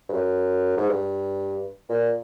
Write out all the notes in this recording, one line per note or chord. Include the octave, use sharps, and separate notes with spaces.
G2
F#2
G#2
G2
A#2